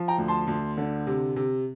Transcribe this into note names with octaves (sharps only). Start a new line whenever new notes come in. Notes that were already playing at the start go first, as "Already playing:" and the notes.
Already playing: F3
G5 A#5
D2
A5 C6
D2
D3
C3
C3